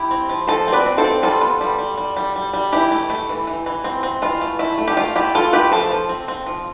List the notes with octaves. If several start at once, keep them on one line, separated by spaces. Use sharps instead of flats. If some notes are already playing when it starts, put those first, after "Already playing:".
Already playing: E4 G4
C4
F3
F3 A4 C5
C4
B4 D5
C4
A4 C5
C4
G3 F4 A4
B3
G3
G3
G3
G3
G3
G3
E3 E4 G4
A3
A3
E3
E3
E3
C4
C4
E3 F4
A3
A3 E4
A3
G4
A3 F4
A3 E4 G4
E3 F4 A4
A3 G4 B4
F3 A4 C5
F3
C4
C4
F3